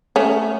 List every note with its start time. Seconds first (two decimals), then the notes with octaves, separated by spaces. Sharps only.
0.16 A3 C#4